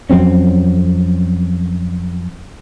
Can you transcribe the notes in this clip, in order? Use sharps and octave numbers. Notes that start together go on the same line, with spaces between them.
F2 F#3 C4 C#4